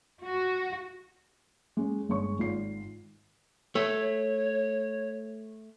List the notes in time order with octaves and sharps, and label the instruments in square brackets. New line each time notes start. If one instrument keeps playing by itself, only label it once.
[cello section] F#4
[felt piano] G#3 C#4
G1 G#3 C#5 C#6
G#1 F4 C7
[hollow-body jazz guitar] A3 [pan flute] C#5